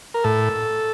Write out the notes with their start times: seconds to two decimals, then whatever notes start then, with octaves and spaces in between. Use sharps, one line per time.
0.14 A#4
0.24 A2 A4